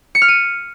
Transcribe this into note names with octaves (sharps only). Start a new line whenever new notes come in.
C#7
F6
D#7